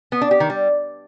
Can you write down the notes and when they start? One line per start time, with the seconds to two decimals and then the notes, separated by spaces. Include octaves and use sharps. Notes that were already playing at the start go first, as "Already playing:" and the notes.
0.12 B3
0.21 D4
0.31 G4
0.40 D#3
0.50 G3